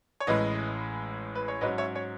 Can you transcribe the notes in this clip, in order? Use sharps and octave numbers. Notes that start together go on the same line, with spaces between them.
C#5
A1 A2 G#3 B4 D#5
B4
C#5
G#2 F#3 C#4 B4 D#5
C#5 E5
C#5